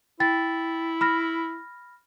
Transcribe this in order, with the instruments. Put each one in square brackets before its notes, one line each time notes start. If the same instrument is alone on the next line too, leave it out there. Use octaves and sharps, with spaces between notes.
[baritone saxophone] E4 [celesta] G5 A6
[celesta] B5 F6 A#6